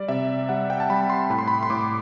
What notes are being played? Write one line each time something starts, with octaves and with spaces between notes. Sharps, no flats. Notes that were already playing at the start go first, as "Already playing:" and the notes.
Already playing: G3 D5
C3 E5
G3 F#5
G5
A5
G3 B5
C6
A2 B5
C6
B5
C6
A2 D6